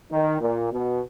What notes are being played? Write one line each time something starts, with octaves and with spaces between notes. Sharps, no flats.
D#3
A#2
B2